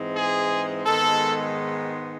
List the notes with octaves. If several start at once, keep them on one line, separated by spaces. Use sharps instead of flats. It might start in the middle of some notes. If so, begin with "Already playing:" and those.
Already playing: G#2 E3 G#3 C4
G#4
G#2 D#3 G#3 B3 A4